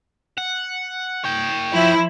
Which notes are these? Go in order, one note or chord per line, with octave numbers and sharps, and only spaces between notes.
F#5
C#5 G5
F3 E4